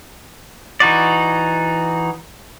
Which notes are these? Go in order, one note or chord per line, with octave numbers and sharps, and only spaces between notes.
E3 D#4 F#4 D5